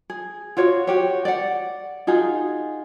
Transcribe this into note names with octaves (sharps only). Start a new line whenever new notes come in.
G#4
F4 F#4 C#5 D5
F#4 G4 C#5
D5 F#5
D#4 F4 F#4 G#4